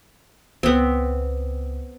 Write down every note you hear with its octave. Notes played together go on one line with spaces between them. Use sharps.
C#2 B3 C4